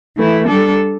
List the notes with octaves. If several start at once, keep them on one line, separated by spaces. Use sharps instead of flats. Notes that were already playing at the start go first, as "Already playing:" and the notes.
E3 A3 E4
G3 D4 A4